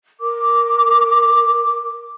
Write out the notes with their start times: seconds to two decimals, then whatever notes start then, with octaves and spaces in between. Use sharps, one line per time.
0.20 A#4 D6